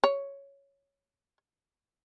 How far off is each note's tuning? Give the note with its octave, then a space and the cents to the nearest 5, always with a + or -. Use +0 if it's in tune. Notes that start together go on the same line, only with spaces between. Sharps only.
C#5 +5